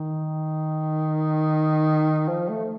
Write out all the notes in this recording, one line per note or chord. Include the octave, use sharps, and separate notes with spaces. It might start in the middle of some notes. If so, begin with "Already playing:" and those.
Already playing: D#3
F3
A3